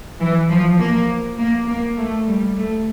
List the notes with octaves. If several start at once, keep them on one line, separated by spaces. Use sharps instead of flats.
E3
F3
A#3
A#3
A#3
A3
G3
A3